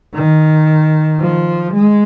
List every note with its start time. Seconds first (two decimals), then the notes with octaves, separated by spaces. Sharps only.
0.15 D#3
1.21 F3
1.74 G#3